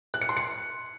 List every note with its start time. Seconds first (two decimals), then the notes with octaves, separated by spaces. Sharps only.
0.14 F#6
0.21 C#7
0.29 C6
0.37 C#7